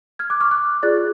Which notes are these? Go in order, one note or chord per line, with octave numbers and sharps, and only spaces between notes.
F6 G#6
D6 F#6
C#6 F6
D6 F#6
F4 G#4 D5 F#6 A6